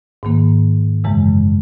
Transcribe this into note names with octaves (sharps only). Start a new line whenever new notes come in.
G#2 D#3 A#3
F#2 C#3 E3 G#3